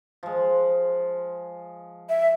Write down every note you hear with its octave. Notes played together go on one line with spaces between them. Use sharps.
F3 G#3
E5